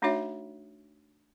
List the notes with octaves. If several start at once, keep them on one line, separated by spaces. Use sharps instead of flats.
A3 D4 D#4 F#4 C#5 E5